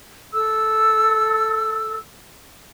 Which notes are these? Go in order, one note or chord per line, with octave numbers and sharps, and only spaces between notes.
A4 E6